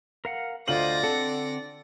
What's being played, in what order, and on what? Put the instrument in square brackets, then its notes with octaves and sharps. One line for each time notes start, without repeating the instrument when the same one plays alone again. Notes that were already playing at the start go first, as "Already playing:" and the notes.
[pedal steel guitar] A#4 F5 F#5
[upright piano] D2 F4 F#7 [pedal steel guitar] C5 D#5 [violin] D5 A#6
[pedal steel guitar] D3 C4 F#5 [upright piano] A4